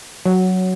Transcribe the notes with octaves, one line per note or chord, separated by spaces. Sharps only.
F#3